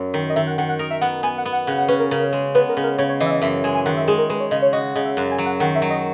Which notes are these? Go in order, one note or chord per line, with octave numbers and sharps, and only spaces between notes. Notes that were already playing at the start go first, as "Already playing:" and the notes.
Already playing: F#2
D#3
D#5
D#3 E5
F#5
D#3 F#5
F#5
A#4 D#5
E5
B3 F#5
B3 G#5
F#5
B3
F#5
C#3 F#5
F#5
C#4 B4
A#4
C#3 A#4
G#3
B3 B4
A#4
C#3
A#4
C#3 C#5
C#5
E3 D#5
E5
D#5
F#2 E5
G#3 G#5
G#5
D#3 F#5
E5
G#3 G#4
A#4
G#3 B4
C#5
C#3 D#5
C#5
F#4 D#5
C#3 D#5
E5
F#2 F#5
G#5
F#3
F#5
D#3 F#5
E5
F#3
D#5